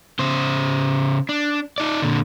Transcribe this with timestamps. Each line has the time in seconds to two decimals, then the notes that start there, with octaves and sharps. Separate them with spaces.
0.19 C#3 C5
1.29 D4
1.78 D#4 D5
2.02 A#2 D3